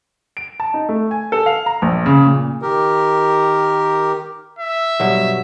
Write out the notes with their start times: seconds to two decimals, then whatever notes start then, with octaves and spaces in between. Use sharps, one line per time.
0.37 D7
0.60 A5
0.74 D#4
0.89 A3
1.11 G#5
1.32 A4
1.46 F5
1.66 A#5
1.82 A#1
2.06 C#3
2.26 A#2
2.62 D#3 G4 A#4
4.59 E5
5.00 G2 B2 F#3